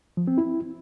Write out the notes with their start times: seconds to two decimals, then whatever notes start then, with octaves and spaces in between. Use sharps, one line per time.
0.17 F3
0.28 C4
0.38 E4